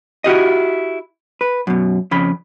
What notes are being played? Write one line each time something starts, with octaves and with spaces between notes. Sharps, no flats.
E4 F#4 G4 D#5
B4
F#2 B2
F2 C#3 B5